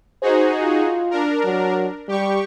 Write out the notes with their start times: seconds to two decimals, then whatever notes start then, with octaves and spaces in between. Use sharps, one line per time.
0.22 D#4 F#4 G#4 C5
0.62 F4
1.11 D4 A#4
1.44 F#3
2.08 G3 G4 C#6